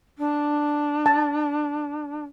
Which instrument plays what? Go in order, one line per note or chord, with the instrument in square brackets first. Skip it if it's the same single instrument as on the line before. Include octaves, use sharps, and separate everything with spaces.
[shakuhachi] D4
[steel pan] A5